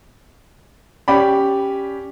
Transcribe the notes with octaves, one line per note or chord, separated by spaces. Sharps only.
C#4 G4 D5 B5